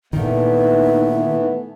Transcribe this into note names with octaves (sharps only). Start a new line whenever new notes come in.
A#2 D#3 E3 A3 B3 D#4